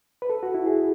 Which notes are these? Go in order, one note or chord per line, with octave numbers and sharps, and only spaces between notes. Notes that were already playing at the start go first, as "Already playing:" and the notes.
B4
A4
F#4
E4
G#4